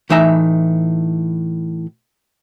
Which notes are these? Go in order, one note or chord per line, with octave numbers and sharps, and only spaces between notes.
A2 E3 D#4 E5 G5 A#5